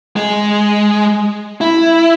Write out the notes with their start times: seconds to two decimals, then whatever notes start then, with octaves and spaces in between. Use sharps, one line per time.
0.16 G#3
1.61 E4